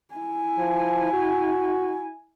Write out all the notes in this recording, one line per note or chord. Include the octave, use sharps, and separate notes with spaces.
E4 G#5
F3
F#4